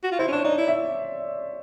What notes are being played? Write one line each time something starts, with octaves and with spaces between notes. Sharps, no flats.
F#4
F4
E4 C5
C#4
D4 C#5
D#4 D5
E4
E5